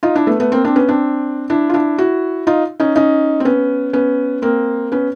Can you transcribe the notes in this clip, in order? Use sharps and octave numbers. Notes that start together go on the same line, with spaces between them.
D#4 F4
D4 E4
A3 B3
A3 B3
A#3 C4
C4 D4
B3 C#4
C4 D4
D4 E4
F4
D4 E4
E4 F#4
D#4 F4
C#4 D#4
C#4 D#4
C4
B3 C#4
B3 C#4
A#3 C4
B3 C#4